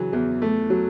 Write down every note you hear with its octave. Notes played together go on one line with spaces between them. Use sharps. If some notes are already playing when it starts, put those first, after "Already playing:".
Already playing: C#3 E3 F#3
E2
A3
F#3